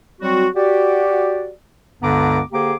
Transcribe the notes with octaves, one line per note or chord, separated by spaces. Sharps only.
F#3 G3 C4 F#4
F#4 G4 D5
C#2 G2 D3 B3 A#5 D6
D3 A#3 G4 G#4 C5 D6